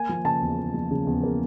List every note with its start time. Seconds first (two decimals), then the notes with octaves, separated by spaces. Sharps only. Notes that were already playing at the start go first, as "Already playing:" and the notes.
Already playing: A#3 G#5
0.09 F3
0.25 C#3 A5
0.41 E2
0.58 A#3
0.74 F3
0.91 C#3
1.07 E2
1.23 A#3